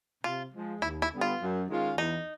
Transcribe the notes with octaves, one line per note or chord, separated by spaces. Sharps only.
C3 F4
F3 G#3
D#2 E4
E4
D3 G3 B3
F4
F#2
D#3 G#3 C#4 F4
E2 D#4